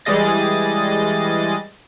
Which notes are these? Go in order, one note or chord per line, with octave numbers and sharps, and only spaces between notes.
E3 G3 G#3 G#4 D#5 A6